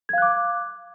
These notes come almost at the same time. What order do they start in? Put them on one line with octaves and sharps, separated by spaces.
G#6 F5 F#6 D6